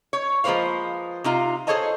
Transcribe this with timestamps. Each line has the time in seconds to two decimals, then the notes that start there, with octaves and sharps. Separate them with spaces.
0.13 C#5
0.44 F3 G#3 A#3 B4 C5 F5
1.24 C3 D#4 F4 F5
1.67 G#4 A4 C5 C#5 D#5 A5